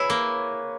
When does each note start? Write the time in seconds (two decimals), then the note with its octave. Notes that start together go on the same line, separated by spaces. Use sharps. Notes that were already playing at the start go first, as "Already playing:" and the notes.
Already playing: E4 G#4 B4 C#5
0.10 A#3